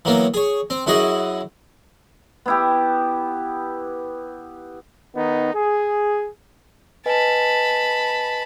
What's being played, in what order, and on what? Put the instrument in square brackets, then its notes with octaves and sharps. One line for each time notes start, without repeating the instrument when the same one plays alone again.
[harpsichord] E3 F#3 A#3 B3
G#4 C#5
C4
F#2 E4 F#4 G#4 D#5
[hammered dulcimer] B3 E4 G4
[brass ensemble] D#3 B3 D#4
G#4
[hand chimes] B4 D#5 G#5 [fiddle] A5 B5